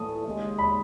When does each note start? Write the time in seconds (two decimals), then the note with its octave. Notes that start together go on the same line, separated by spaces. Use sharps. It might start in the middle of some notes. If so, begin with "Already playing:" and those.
Already playing: A2 E3 A3 D#6
0.26 D#2 C#3 G#3 D#4
0.59 B5